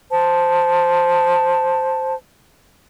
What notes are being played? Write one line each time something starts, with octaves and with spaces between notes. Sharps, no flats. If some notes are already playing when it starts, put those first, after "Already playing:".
C5 A5